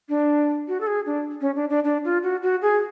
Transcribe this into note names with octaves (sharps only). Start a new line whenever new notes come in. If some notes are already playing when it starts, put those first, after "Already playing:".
D4
F#4
A4
G#4
D4
C#4
D4
D4
D4
F4
F#4
F#4
G#4